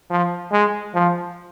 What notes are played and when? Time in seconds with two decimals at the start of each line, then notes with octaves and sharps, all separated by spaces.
0.11 F3
0.52 G#3
0.94 F3